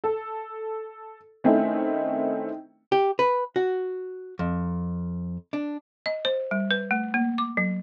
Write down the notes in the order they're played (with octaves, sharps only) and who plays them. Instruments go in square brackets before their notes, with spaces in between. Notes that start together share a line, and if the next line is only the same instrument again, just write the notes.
[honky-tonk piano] A4
D#3 A3 C4 C#4 D#4 E4
[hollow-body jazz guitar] G4
B4
F#4
F2
D4
[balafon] D#5
C5
G3
B4
A3
A#3
D6
F#3